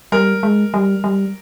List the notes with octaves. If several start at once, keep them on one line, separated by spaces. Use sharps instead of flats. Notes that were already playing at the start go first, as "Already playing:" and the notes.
G3 A#4
G#3
G3
G3